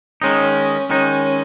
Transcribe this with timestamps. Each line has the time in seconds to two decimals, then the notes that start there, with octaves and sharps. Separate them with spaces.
0.22 D#3 G#3 C#4 D#4
0.90 D#3 G#3 C#4 D#4